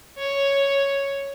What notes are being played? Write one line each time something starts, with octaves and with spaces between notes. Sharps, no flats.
C#5